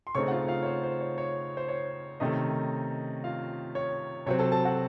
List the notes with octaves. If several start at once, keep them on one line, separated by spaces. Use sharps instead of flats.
C6
C#3 A3 C4 D#4 C#5 C#6
F#5
F4 F5
F4 F5
C#5
C5
C5
C#5
C#5
C5
C#5
C3 D#3 A3 C#4 D#4 D#5
F4 F5
C#5
C3 F#3 C4 C#5
A4 A5
A4 A5
F#4 F#5